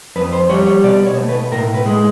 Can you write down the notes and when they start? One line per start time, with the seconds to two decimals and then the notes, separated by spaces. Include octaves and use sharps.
0.16 F2 B4
0.33 C5
0.49 G3 C#5
0.67 C#5
0.84 B2 D5
1.06 C#5
1.18 A3
1.29 B4
1.52 A2 A#4
1.74 B4
1.86 G#3